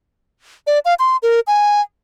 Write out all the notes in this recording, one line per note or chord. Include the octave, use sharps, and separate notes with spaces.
D5
F5
C6
A#4
G#5